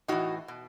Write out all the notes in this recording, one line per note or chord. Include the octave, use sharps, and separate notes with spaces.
A2 E3 D#4 F#4
B2